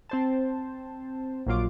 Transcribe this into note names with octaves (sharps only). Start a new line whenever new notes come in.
C4 C5 A5
A#1 A#2 F#3 F4 D6